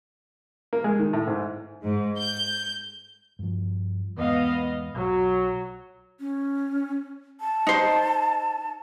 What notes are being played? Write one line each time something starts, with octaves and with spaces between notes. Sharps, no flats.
A#3
G#3
D#3
A2
G#2
G#2
G6
G2 F3
E2 G#2 B3 D#5 F5
B1 F#3
C#4
A5
D#4 C5